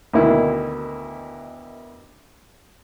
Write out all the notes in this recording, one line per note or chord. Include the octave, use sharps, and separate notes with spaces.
D2 B2 D#3 A#3 E4 D#5